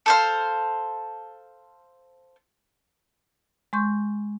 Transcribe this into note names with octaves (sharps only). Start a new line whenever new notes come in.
A4 C5 F5
G#3 C6 C#6 G6